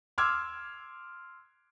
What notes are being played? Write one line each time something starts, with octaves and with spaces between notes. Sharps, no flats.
C6 D6 E6 F6 G#6